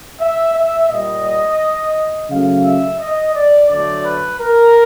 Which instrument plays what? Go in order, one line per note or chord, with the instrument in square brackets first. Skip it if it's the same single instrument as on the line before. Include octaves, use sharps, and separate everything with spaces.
[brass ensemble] E5
E5
A#2 G3 D#5
C#3 F#3 A3 F5
E5
D#5
D5
D3 F#3 A3 D5
B4
A#4